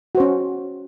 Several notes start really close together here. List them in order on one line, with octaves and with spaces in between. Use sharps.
F#4 C5 C#4